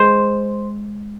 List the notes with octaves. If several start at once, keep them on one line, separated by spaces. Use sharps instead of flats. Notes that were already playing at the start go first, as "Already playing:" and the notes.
Already playing: G#3 C5